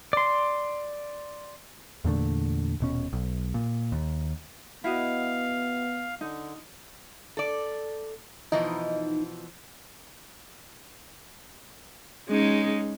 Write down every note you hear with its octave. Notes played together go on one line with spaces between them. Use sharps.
D5 C6
E2 A#2 D3 A3
D#1 B2 C#4
B1
A#2
D#2
B3 E4 F#4 D#5 F5
D3 D#4
A4 D5
B2 E3 F3 D#4
G#3 C#4 D#4